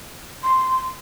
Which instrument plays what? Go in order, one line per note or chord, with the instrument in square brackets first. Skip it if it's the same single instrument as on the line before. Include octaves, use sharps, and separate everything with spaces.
[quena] C6